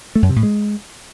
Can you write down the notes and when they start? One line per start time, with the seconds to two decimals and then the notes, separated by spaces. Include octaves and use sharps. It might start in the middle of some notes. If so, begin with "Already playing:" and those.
0.15 A3
0.22 F#2
0.29 C3
0.36 A2
0.43 G#3